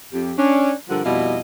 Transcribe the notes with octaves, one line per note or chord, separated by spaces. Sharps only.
F2 G4
C#4 D4
G2 D3 F3 G3 A#4 F#5
F2 B2 G3 E4 D#5 F5